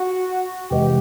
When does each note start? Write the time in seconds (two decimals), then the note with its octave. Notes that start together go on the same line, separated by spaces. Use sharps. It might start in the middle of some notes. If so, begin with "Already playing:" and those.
Already playing: F#4
0.70 F2 C3 E3 G#3 G4